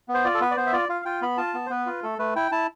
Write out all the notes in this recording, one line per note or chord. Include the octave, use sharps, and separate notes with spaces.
B3
C5
F4 D5
A4
B3 B4
D5
B3 C5
E5
F4 D5
F4 F5
F4 G5
B3 B5
F4 A5
B3
C5
B3 B4
F4
A3 A4
A3 B4
E4 G5
E4 A5